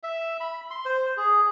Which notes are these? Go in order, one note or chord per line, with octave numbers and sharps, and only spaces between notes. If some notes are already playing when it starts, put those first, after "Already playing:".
E5
B5
C6
C5
G#4